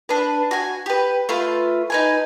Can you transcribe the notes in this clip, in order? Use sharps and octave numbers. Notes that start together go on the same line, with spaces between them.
D4 B4
F#4 G#5
G4 B4
A3 F4 B4
D#4 B4 G#5